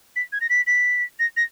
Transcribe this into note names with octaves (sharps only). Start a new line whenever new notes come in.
B6
G#6
A#6
B6
B6
A#6
A#6